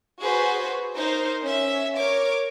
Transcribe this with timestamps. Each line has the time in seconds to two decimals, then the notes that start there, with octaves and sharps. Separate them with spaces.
0.20 F#4 G#4 B4 C5
0.94 D#4 A#4 C5
1.42 C#4 E5
1.96 A#4 C#5 D6